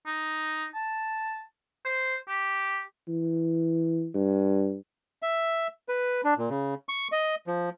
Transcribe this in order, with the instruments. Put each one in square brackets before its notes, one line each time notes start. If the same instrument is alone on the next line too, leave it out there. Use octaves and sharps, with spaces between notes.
[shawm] D#4
A5
C5
G4
[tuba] E3
G2
[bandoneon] E5
B4
D4
A#2
C#3
C#6
D#5
F3